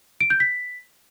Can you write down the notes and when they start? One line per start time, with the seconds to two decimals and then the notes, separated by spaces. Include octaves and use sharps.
0.21 D7
0.30 G6
0.40 B6